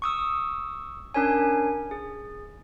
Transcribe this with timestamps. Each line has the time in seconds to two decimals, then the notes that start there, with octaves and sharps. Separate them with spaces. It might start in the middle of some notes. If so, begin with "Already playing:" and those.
0.02 C#6 D#6 E6
1.14 C#4 D4 A#4 C#5 G#5
1.91 G#4